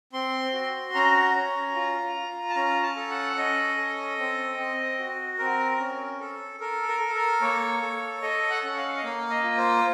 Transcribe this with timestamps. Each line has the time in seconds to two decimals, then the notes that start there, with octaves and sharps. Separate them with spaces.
0.13 C4 C6
0.53 F#4
0.94 C#4 A#5
1.34 C#4
1.75 F4
2.16 F4
2.49 A5
2.55 C#4 A#5
2.83 A5
2.97 A4
3.10 F#5
3.37 C#4 D#5
3.78 A4
4.18 C4
4.58 C4
4.99 F#4
5.39 C4 A#4
5.79 C#4
6.20 A4
6.60 A4 A#4
6.88 A#4
7.00 A4
7.15 A#4
7.41 A#3 C#5
7.82 A4
8.22 A4 D#5
8.50 F#5
8.64 C#4
8.77 F5
8.97 D#5
9.03 A#3 F5
9.30 D#5
9.43 F4
9.57 C5